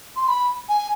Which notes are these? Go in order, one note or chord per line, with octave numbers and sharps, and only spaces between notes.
C6
B5
G#5